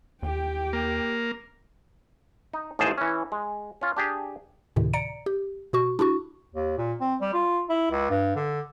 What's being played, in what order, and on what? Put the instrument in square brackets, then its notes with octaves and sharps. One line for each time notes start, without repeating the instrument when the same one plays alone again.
[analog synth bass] D#2 [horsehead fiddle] G4 G5
[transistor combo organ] A#3
[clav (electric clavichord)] D#4
A1 D#2 G#2 G#4 C5 A5
E3 C#4
G#3
C#4 F4
D4 G4 G#4
[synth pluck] D2 A2 C3 D#3
D5 A#5 C#7 D7
G4
B2 F#4 C#6
D4 E4 F#4 C#6
[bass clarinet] D#2
A#2
C4
G3
F4
E4
C#2
G2
D3